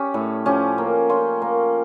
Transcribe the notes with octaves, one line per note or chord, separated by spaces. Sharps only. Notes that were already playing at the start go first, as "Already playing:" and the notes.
Already playing: C#4 G4
A2
F3 C#4 G4
A#3
C#4 F4
A#3